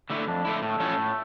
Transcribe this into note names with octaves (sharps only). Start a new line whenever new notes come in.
D3 A3 E4
F2 D4
D3 A3 E4
A2 A3
F3 C#4 E4 A4
A2